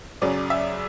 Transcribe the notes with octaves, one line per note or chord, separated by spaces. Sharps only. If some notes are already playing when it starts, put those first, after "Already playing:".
F#2 C#3 F#3 C#4 D5
E5